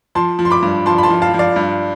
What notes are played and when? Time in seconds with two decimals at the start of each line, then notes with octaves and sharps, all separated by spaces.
0.15 F3 A5 C6
0.39 F3
0.45 C6
0.51 B5 D6
0.62 G2
0.86 F3 A5 C6
0.98 B5
1.03 A5 C6
1.10 F3
1.22 F5 A5
1.34 F3
1.39 D5 F5
1.56 G2